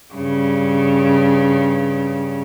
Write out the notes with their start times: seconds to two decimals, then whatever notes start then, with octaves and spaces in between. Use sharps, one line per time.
0.14 G2 C#3